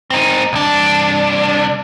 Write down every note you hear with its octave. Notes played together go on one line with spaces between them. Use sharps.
C4 D#4
C2 D4